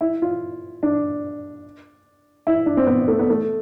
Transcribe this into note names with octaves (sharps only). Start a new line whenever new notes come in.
E4
F4
D4
E4
D4
C4
B3
A3
B3
A3